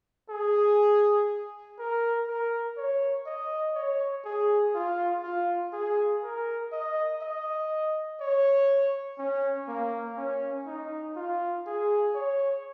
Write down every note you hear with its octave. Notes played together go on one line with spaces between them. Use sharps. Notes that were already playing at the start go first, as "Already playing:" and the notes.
G#4
A#4
A#4
C#5
D#5
C#5
G#4
F4
F4
G#4
A#4
D#5
D#5
C#5
C#4
A#3
C#4
D#4
F4
G#4
C#5